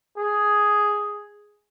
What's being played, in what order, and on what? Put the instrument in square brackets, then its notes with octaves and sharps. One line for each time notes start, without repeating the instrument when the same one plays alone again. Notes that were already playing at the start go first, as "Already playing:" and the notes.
[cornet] G#4